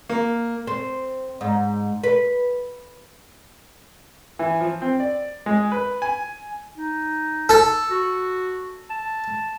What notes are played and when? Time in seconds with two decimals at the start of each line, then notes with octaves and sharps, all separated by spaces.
0.09 A#3
0.67 C4
1.41 G#2
2.03 B4
4.39 E3
4.61 F3
4.82 C4
5.00 D5
5.46 G#3
5.72 B4
6.02 G#5
6.77 D#4
7.49 A4
7.91 F#4
8.90 A5